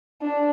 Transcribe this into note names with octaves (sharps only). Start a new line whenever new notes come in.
D4